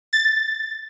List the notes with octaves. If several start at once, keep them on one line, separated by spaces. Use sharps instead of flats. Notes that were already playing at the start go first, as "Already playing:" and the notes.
A6